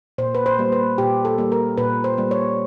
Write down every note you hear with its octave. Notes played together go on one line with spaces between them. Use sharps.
A#2 C5
B4
C5
G3 A#3
B4
A#2 G4
A4
G3 A#3
A#4
A#2 B4
C5
G3 A#3
C#5